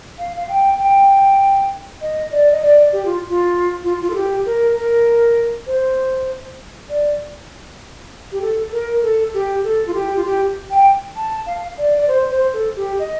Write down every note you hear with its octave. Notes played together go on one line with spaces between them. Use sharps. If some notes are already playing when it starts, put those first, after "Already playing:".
F5
F5
G5
G5
D#5
D5
D#5
D5
G4
F4
F4
F4
F4
A4
G4
A#4
A#4
C5
D5
G4
A4
A#4
A4
G4
A4
F4
G4
F4
G4
G5
A5
F5
D5
D5
C5
C5
A4
G4
D#5